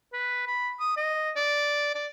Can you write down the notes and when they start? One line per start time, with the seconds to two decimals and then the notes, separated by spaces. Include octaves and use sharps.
0.13 B4
0.47 B5
0.80 D#6
0.97 D#5
1.36 D5
1.95 D5